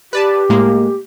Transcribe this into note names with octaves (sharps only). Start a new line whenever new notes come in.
G4 B4 D5 A5
A2 G#3 A#3